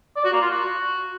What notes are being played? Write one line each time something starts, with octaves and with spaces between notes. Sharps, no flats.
D5
F#4
A#3
F4
F#4